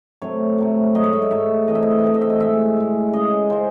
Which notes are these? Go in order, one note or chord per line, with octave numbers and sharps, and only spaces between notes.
C3 F#3 A3 C#5
C3 F#3 A3
G#2 F#3 A3 D#5
C#5
E5
D#5
G#2 F#3 A3 E5
C3 E3 A3 D#5
E5
D#5
E5
D#5
C3 E3 A3 E5
D#5
E5
D#5
A2 G#3 E5
A2 G#3
C#3 G#3 D#5
C#3 G#3 C5